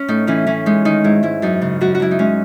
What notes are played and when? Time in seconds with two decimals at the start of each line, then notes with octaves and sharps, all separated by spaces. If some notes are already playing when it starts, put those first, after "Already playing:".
Already playing: C#4
0.08 A2 D#4
0.27 E3 C#4
0.47 E3 C#4
0.66 G#3 D#4
0.85 D#3 D#4
1.04 G#2 E4
1.23 G#2 E4
1.42 F#2 D#4
1.61 C#3
1.81 F#2 F#4
1.95 F#4
2.00 F#2 E4
2.11 D#4
2.19 G#3 C#4